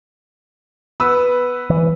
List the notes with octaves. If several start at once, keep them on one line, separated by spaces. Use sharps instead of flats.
B3 B4 E6
E3